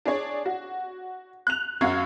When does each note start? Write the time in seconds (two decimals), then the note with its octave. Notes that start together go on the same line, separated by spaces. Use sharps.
0.06 D4 G#4 C#5
0.45 F#4
1.47 F#6 F7
1.81 F#2 F#3 F#4 F5 C#6 G#6